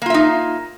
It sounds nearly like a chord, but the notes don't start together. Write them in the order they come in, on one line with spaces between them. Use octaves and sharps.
A#3 F4 E5 D#4